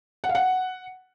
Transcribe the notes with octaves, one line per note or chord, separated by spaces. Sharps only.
F#5
F5
F#5